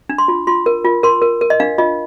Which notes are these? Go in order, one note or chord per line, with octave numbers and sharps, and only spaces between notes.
D4
C6
F4
F4 C6
A#4
F4
A#4 C6
A#4
A#4
D#5
D4 F5
F4 D#5